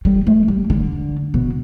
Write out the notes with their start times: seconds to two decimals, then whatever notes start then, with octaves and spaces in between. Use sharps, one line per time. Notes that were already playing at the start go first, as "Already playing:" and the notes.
0.05 G3
0.27 A3
0.48 G3
0.70 D3
1.34 B2